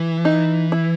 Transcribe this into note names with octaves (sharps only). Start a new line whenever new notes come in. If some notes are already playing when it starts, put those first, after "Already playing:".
Already playing: E3
D#4
E4